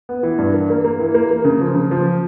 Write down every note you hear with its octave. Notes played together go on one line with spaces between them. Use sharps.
B3
E3
G2
A#3
A#3
A#3
E3
A#3
A#3
C#3
F3
C#3
F3